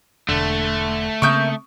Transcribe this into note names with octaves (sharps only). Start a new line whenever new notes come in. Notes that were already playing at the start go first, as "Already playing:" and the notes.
E1 D3 A3
C#3 A#3 C4 A#4 E5 C#6 D#6 G6